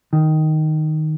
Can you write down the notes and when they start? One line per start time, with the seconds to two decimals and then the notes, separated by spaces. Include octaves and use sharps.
0.13 D#3